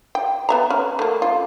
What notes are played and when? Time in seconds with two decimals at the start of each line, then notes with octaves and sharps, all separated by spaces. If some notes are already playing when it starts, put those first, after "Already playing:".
0.15 G5
0.49 B3 E5 A#5
0.70 C#4
0.99 A3 A#3
1.22 F4